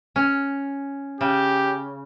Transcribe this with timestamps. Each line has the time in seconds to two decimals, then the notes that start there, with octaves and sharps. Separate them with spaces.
0.16 C#4
1.21 C#3 G4